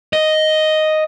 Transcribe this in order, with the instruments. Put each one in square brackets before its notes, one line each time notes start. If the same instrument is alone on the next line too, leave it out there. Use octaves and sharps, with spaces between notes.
[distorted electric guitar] D#5